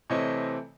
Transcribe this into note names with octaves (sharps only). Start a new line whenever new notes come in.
C3 E3 A3 C4 C#5 D#5